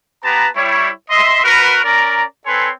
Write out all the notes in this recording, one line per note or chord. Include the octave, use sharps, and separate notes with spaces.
B3 G4 B4 A5 A#5
G3 E4 C#5
D#5 E5 C6
F#4 A#4 B4
C#4 A#4 D5 A#5
C4 A4 B4 C#5 G#5 C6